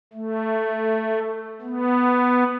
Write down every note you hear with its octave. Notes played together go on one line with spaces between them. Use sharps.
A3
B3